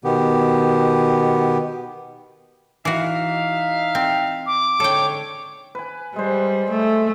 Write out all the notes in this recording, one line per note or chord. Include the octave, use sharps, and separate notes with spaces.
B2 D#3 B3 G4
E3 D#4 F#4 E5 F5
C4
D6
G#2 D3 A4 C#5 G5
B4 G#5
G3 G#3 C5
A3